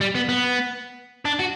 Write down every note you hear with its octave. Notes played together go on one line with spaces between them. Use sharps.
G3
B3
B3
D4
F#4